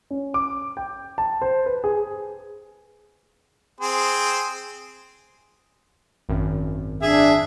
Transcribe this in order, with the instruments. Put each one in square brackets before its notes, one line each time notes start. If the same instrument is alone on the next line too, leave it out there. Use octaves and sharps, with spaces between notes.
[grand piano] C#4
D6
G5
A5
C5
B4
G#4
[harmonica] C4 G#4 C5
[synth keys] G#1 F#2
[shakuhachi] D4 [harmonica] G#4 E5